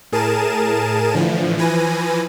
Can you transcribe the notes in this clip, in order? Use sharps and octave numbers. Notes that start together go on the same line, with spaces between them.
A2 G#4 A#4 A5 D#7 E7
A2 D3 E3 F3
E3 F3 B4 G#5 A#6 D#7